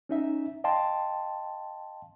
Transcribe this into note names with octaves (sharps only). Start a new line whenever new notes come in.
C#4 D#4 E5
D#5 F5 G5 A5 C6